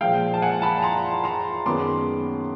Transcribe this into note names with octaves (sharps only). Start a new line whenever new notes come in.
A#2 F3 G#3 F5 G5
A5
F#5 G#5
A5 B5
A#5 C6
A#5 C6
F#2 D#3 G#3 B3 C6 D6